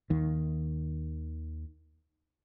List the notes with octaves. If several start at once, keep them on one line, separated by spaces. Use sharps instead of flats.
D#2 D#3